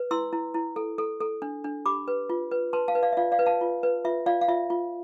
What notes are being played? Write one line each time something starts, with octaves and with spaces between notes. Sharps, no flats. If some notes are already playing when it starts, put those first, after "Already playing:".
Already playing: B4
E4 C6 E6
E4
E4
A4
A4
A4
D4
D4
G4 B5 D6
B4
F4
B4
B4 A5 C6
F5 A5
B4
D5 F5
E5
F4 D5 F5
D5 F5
B4
F5 A5
F4
B4
F4 E5
F4 D5 F5
F5
F4 E5
F4